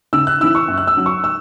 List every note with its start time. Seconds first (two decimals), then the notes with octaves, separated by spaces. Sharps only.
0.13 C#3 E6
0.27 F#6
0.40 E3 C#4 E4 E6
0.55 C#6
0.68 F#2
0.78 F#6
0.87 E6
0.97 F#3 C#4
1.06 C#6
1.24 E6